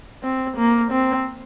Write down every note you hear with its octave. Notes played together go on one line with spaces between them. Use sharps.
C4
A#3
C4